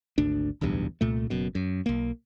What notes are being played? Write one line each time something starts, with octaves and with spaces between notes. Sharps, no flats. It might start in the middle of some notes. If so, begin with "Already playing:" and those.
G#1 D2 D4
D1 B1 E2 G2
C2 A#2 A3
F#1 F#2 B2
F#2
B1 A#3